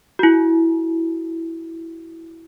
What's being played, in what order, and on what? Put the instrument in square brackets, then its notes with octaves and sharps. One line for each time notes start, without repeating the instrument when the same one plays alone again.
[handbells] E4 F#4